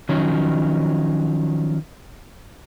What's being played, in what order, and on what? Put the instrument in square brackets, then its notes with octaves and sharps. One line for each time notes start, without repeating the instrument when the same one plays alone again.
[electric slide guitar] D#3 F3 F#3 C#4